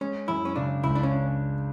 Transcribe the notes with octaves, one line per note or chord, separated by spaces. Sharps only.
G#3 C#4
F#2 E4
C#4
C#3 D4
C#2 E4
D4
C#4
D4